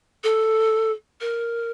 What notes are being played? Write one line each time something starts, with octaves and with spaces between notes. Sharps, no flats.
A4
A#4